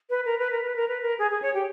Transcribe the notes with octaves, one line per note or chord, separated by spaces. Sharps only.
B4
A#4
B4
A#4
B4
A#4
B4
A#4
G#4
G#4
C#5
G4